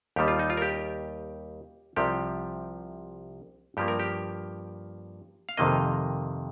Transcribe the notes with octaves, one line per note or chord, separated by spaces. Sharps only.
D#2 D#3 G3 G4
F4
D#4
F4
A#4
G4
C2 C3 F3 G4
G2 F3 A#3 G4
A#4
G4
F5
F2 C3 D#3 A#3 D#5